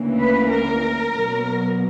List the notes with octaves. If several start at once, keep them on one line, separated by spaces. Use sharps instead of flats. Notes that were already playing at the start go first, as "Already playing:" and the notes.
Already playing: D2 C#3 E3 A#3
B4
A#4
B2 F#3 A#3